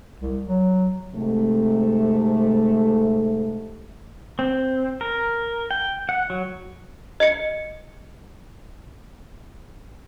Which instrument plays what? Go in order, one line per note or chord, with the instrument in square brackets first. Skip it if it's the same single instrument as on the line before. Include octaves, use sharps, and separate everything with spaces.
[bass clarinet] C2
F#3
[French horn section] G#2 C3 A3
[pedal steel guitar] C4
A#4
G5
F#5
F#3
[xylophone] D#5 C#7